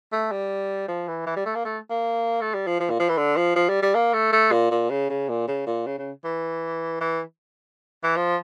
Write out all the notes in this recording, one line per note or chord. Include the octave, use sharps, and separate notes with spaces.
A3
G3
F3
E3
E3
G3
A3
A#3
A3
A#3
A3
G3
F3
F3
A#2
F3
E3
D3
F3
F3
G3
G3
A#3
A3
A3
A#2
A#2
C#3
C#3
A#2
C#3
A#2
C#3
C#3
E3
E3
E3
F3